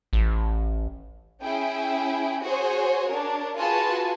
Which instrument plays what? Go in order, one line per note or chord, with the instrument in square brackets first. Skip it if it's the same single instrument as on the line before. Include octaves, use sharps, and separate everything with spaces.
[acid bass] A1
[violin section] C#4 E4 G#4 G5
F#4 G#4 C5 C#5
D4 A#4 C#5
F4 F#4 G#4 B4 G#5 A5